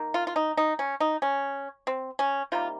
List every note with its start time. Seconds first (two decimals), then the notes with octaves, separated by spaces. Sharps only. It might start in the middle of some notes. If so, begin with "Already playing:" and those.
Already playing: D#3 A#3
0.14 F4
0.27 F4
0.36 D#4
0.57 D#4
0.79 C#4
1.00 D#4
1.22 C#4
1.87 C4
2.19 C#4
2.52 C3 D#3 G3 A#3 F4